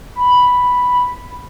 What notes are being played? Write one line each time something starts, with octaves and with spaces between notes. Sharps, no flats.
B5